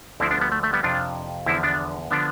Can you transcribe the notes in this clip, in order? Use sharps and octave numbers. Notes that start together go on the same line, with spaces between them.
D2 D3 F3 C4 E4
B3 D4
G3 B3
A3
A3
G3 B3
F2 C3 F3 D4 F4
E2 D3 F3 C4 E4
B3 D4
D3 F3 B3 D4